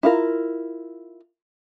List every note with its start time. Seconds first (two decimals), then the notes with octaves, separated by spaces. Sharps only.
0.03 E4 F4 A#4